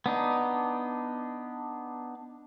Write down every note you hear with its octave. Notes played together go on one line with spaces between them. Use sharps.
B3 D4 D#4